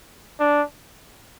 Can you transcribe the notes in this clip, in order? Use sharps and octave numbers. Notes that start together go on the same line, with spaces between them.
D4